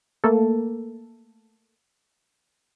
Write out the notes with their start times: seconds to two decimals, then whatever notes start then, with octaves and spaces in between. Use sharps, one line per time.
0.24 A3 A#3 A4